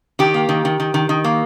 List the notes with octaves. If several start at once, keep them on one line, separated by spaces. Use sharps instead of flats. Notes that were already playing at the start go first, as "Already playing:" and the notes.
D#3 G4
A#3
D#3
D#3
D#3
D#3
D#3
A#3